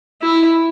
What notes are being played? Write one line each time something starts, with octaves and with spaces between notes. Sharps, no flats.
E4